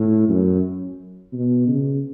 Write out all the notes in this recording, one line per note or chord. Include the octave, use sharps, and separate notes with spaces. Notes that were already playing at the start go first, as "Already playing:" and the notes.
Already playing: A2
F#2
B2
C#3